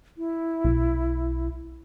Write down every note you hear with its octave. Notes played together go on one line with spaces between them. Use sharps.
E4
B1